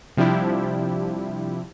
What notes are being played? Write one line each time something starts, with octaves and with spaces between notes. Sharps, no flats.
C3 F3 G3 D4 E4 G4